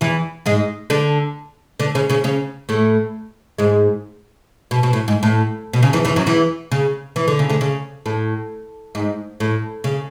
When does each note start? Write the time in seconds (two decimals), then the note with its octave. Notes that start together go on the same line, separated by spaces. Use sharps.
0.01 E2 E3
0.46 G#2 G#3
0.90 D3 D4
1.80 D3 D4
1.95 C#3 C#4
2.09 C#3 C#4
2.24 C#3 C#4
2.69 A2 A3
3.58 G#2 G#3
4.71 B2
4.83 B2
4.93 A2
5.08 G#2
5.23 A2
5.73 B2
5.83 C#3
5.93 E2 E3
6.05 E2 E3
6.16 F#2 F#3
6.26 E2 E3
6.72 C#3
7.16 E3
7.28 D3
7.39 C#3
7.49 D2 D3
7.61 C#3
8.06 A2
8.95 G#2
9.40 A2
9.84 C#3